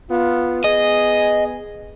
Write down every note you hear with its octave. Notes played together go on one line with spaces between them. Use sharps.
B3 F4
B3 G#4 D#5